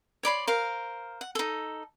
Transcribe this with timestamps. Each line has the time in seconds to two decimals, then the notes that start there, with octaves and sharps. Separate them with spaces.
0.23 C#5 D5 B5 C6
0.47 A#4 C5 F5
1.21 F#5
1.35 D#4 A4